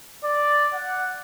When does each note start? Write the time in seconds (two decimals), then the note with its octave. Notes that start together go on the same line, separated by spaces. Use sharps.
0.23 D5
0.73 F#5